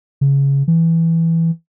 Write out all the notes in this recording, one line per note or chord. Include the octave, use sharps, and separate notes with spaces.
C#3
E3